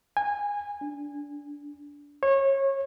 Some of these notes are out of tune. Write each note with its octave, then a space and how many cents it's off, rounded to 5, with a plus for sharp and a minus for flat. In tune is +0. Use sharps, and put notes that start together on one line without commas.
G#5 -20
D4 -20
C#5 -25